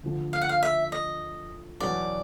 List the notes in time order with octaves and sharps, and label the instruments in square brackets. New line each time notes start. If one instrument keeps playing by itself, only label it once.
[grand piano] D2 D3 F3
[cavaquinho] F5
F#5
F5
E5
D#5
[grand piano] E2 B2 F#3 B3 [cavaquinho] D5